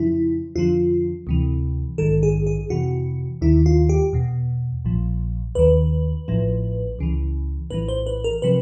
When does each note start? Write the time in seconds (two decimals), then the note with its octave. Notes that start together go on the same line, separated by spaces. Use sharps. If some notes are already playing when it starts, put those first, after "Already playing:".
Already playing: F2 C#3 F3 E4
0.55 F2 D3 F3 F4
1.27 D2 C3 E3
1.98 A#1 G#2 D#3 A4
2.23 G#4
2.46 G#4
2.70 F2 C3 E3 F#4
3.41 D#2 D#3 E4
3.66 F4
3.89 G4
4.13 E2 B2
4.85 A#1 A#2 F3
5.55 D#2 D#3 B4
6.28 A1 A2 F3
6.99 C#2 C#3 E3
7.70 A#1 A2 E3 B4
7.88 C5
8.06 B4
8.24 A#4
8.42 C3 F3 B4